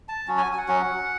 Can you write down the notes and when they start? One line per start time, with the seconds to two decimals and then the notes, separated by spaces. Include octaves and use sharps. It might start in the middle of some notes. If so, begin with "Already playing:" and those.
0.09 A5
0.28 F#3 C#4 F#4
0.37 G#5
0.53 G#5
0.58 F#5
0.68 F#3 C#4 F#4